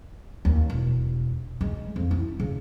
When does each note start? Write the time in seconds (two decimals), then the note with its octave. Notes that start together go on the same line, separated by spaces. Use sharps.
0.45 D#2
0.70 E1
1.61 G#3
1.96 F2
2.11 E4
2.40 C#3